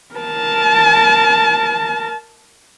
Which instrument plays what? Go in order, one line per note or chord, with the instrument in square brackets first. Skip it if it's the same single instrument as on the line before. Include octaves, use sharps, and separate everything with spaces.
[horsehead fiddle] A#4 A5